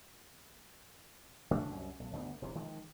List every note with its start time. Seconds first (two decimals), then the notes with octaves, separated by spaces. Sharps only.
1.51 C#3 A3 D4
1.70 C2 F#2
2.00 B1
2.12 G1 D2 D3 B3
2.42 F1 C3 E3
2.55 D#3 F3 G#3